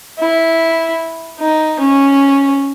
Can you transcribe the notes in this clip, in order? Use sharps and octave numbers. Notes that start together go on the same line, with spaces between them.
E4
D#4
C#4